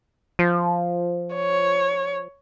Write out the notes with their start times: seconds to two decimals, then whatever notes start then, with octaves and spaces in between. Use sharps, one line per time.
0.39 F3
1.35 C#5